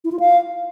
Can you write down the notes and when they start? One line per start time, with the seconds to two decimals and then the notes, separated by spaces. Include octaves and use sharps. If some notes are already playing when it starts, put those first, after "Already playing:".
0.04 E4
0.12 F4
0.20 F5